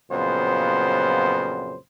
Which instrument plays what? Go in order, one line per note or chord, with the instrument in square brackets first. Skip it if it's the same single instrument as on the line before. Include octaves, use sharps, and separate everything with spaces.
[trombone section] F2 A#2 C#3 F#3 B3 C5